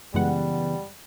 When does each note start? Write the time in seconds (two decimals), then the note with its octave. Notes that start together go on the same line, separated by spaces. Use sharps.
0.14 F#2 C#3 E3 G3 G#3 B3 F#5